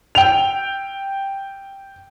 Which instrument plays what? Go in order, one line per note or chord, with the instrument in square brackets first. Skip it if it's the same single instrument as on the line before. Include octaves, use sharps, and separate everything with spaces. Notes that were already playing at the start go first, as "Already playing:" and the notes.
[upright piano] G5 F7